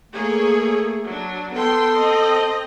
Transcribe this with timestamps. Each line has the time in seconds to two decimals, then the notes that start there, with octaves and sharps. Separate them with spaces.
0.12 A3 A#3 G#4 C#5
1.04 F#3 D4
1.52 B3 A4 G5 C6
1.95 C4 D#5